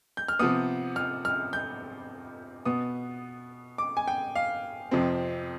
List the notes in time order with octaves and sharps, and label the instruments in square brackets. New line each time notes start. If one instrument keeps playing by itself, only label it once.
[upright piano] G6
F6
C3 F3 B3 D#6
F6
F6
G6
B2 B3 D#6
D6
G#5
G5
F5
F2 C3 F3 C4